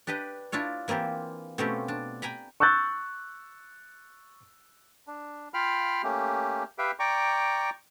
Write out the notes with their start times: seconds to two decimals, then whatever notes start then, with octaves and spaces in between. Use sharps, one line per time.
0.07 D4 G4 B4 D#5 G5
0.52 D4 E4 F4 C#5
0.88 E3 A#3 C4 F4 G4
1.58 B2 A3 C4 C#4 F4 G4
1.88 D4
2.22 G5 G#5 A#5 B5
2.60 C#6 E6 F#6 G6 A6
5.07 D4
5.54 F4 F5 G5 B5 F6
6.03 A3 A#3 C#4 G4
6.78 G4 B4 E5 F5 G5
6.99 D5 G5 A#5 C#6 D6